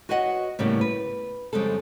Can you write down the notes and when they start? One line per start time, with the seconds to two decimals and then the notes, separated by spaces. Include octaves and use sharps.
0.09 F#4 B4 C#5 D#5 F#5
0.59 A2 C#3 G3 A#3 B3
0.81 B4
1.53 F2 C#3 G3 G#3 A4